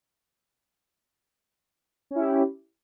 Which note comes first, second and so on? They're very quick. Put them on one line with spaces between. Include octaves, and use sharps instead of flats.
C#4 E4 G4